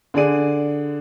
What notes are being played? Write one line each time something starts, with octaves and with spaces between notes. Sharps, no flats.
D3 G#4 D5 D#7